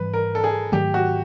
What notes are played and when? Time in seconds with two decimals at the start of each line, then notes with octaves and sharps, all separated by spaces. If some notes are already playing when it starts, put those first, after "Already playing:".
Already playing: G#2 E3 G3 B4
0.13 A#4
0.35 A4
0.44 G#4
0.72 G#2 D#3 F#3 A3 G4
0.94 F#4